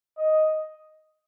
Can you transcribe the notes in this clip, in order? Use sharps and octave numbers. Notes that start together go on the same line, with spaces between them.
D#5